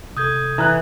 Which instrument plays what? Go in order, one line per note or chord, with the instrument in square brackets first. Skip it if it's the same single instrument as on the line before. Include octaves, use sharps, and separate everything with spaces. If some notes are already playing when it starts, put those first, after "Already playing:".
[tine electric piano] C3 A4 [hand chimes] D#6 G6 G#6
[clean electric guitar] E3 [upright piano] A#5 F#6